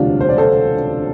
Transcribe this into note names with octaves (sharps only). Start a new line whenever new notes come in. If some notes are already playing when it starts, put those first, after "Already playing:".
Already playing: E1 D2 C3 G3 D4 F4
C5
D5
A4 C5